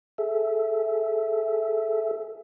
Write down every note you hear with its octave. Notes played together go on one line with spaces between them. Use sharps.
G#4 A4 E5